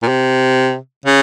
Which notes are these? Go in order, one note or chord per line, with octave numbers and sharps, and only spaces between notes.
A#2
C3
C#3